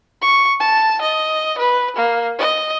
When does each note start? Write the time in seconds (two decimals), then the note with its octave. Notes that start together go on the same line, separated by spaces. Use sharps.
0.22 C#6
0.60 A5
1.01 D#5
1.58 B4
1.96 A#3
2.39 D#5